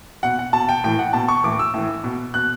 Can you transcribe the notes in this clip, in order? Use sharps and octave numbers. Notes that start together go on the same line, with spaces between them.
B2 F#5
F#5
B2 A5
G5
A2 E3 G5
F#5
B2 A5
C#6
A2 E3 D6
E6
A2 E3
B2
B2 F#6